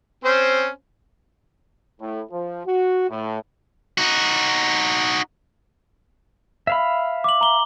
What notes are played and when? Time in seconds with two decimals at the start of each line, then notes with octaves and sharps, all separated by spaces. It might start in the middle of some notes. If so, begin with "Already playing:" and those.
0.24 C4 C#4 C5
2.00 A2
2.31 F3
2.66 F#4
3.09 A2
3.98 D#4 F#4
6.67 E5 F5 B5
7.24 D6 F#7
7.41 A#5 G7